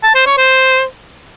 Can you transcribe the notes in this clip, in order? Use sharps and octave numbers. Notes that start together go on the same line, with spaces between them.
A5
C5
C#5
C5